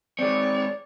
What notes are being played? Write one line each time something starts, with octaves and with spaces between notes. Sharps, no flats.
G#3 C4 C#5 D5